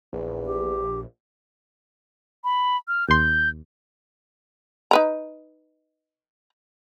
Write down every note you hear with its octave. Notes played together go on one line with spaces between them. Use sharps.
A#1 E2
G4
B5
F6
D#2 C6 G6
D#4 B4 A#5